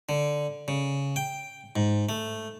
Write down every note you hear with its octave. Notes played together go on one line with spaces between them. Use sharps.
D3
C#3
G5
G#2
A3